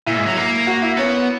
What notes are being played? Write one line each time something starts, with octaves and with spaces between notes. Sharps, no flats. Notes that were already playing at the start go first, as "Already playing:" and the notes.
A#2 E4
G#2
F#3
A#3
F#4
E4
B3 C#4